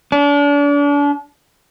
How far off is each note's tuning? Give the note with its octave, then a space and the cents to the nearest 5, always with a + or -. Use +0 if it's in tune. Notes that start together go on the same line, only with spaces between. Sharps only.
D4 -35